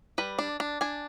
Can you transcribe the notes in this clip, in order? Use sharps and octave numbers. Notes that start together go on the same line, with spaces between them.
G3 B4
D4
D4
D4 G#5